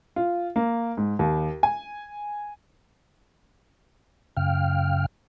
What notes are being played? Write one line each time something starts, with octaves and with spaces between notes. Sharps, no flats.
F4
A#3
G#2
D#2
G#5
F#2 C#3 F5 G5 F6